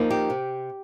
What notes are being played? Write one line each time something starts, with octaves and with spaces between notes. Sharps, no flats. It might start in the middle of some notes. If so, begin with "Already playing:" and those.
Already playing: F3 A#3 D#4
G4
C3